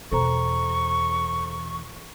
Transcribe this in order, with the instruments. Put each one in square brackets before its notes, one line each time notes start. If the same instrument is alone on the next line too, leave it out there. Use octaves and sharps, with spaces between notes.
[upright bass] E2 B2 [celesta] A4 C5 A#5 [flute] C#6